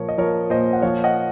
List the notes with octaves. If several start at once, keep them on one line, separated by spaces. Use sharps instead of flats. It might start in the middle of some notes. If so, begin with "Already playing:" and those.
Already playing: A#2 F3 A#4 C#5
D#5
F3 A#4 C#5
A#2 C5 D#5
F#5
F3 C#5 F5
D#5 F#5